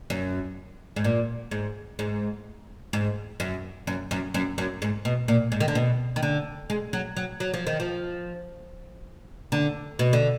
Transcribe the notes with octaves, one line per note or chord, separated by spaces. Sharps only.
F#2
G#2
A#2
G#2
G#2
G#2
F#2
F#2
F#2
F#2
F#2
G#2
B2
A#2
G#2
D#3
D3
B2
D#3
D3
G#3
F#3
F#3
F#3
F3
D#3
F3
D3
B2
D3